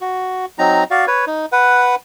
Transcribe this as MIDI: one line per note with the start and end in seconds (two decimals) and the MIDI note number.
0.01 0.45 66
0.58 0.84 54
0.58 0.84 60
0.58 0.84 63
0.58 0.84 82
0.91 1.05 66
0.91 1.05 74
0.91 1.05 77
1.07 1.25 71
1.07 1.25 73
1.27 1.46 63
1.52 1.95 71
1.52 1.95 78